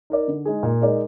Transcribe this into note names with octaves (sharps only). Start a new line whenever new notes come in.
D#4 A#4 D5
D3
G#3 D#4 G#4
A#2
G#3 D#4 A#4 D5